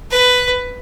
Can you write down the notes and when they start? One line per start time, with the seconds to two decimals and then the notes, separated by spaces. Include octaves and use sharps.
0.11 B4